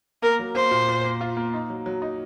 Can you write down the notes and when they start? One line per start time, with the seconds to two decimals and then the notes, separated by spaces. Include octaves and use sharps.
0.22 A#3 A#4
0.39 F#3
0.55 A#3 C5
0.71 A#2
0.88 A#2
1.04 A#3
1.21 F4
1.37 A#3
1.54 D#4
1.70 F#3
1.86 F#3
2.02 D#4